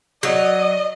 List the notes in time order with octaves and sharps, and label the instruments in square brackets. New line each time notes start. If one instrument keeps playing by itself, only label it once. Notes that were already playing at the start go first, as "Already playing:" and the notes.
[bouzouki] F#3 [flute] D5 [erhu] D#5